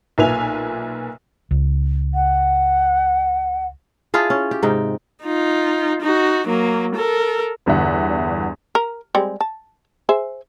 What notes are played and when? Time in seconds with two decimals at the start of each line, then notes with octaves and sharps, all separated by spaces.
0.18 B1 A#2 B4 E5 G#5 F7
1.51 C#2
2.14 F#5
4.14 D4 E4 F4 G#4
4.30 C#4
4.51 G4
4.63 G#2 C3 D#4 G5
5.24 D#4 F4
6.02 D#4 F#4
6.48 F#3 A#3
6.95 A4 A#4
7.66 G1 E2 D3 G3 E5 F#5
8.75 A#4
9.15 G3 G#3 C4
9.41 A5
10.09 G#4 C5 E5